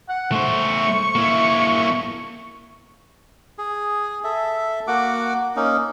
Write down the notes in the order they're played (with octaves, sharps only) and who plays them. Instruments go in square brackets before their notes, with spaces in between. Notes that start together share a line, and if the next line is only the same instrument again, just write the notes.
[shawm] F#5
[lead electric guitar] A3 C5 [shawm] C#6
[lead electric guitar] A#3 E4
[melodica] G#4
A4 E5
A#3 F#4 F#5 D6
A#3 C#4 D#4